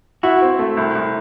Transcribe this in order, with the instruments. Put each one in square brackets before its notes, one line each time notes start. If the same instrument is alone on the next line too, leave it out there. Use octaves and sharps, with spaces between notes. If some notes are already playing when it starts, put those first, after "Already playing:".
[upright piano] E4 [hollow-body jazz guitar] F#4
[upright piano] C4
A3
C2
C2